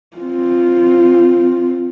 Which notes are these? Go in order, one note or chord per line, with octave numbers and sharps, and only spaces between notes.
C4 F4